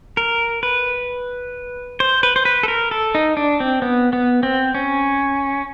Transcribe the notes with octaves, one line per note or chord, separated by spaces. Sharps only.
A#4
B4
C5
B4
C5
B4
A4
A#4
A4
D#4
D4
C4
B3
B3
C4
C#4